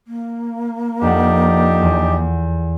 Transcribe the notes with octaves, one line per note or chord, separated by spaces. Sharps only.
A#3
F2 D4 D#4 G4 F#5
E2